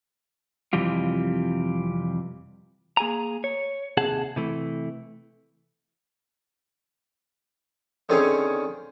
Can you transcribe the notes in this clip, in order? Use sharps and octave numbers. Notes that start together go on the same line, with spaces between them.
F2 C3 E3 G3 F4
A#3 G#4 G#5 A#5
C#5
D#2 C3 G#4 F#5 A5
C3 E3 A3
D3 D#3 C4 C#4 G#4